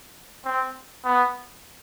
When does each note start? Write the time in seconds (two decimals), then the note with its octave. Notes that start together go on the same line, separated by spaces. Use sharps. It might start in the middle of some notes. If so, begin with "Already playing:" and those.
0.45 C4
1.05 B3